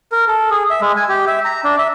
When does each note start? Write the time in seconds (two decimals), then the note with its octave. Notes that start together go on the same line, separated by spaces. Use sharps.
0.12 A#4
0.28 A4
0.51 G#4
0.70 E5
0.81 G#3
0.97 G#5
1.09 G4
1.27 E5
1.45 A#5
1.64 D4
1.78 E5